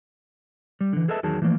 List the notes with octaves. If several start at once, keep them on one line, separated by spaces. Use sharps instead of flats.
G3
D3 E3
G#4 A4 B4 D#5 E5 A5
E2 D#3 F#3 G#4 A5
E3 F3 A3 A#3